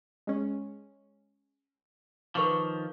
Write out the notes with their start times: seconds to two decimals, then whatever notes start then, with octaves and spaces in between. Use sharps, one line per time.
0.27 G#3 C#4
2.35 D#3 F3 B4 C#6 D6